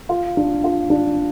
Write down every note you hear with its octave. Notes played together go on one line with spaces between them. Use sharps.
F4
D4
F4
D4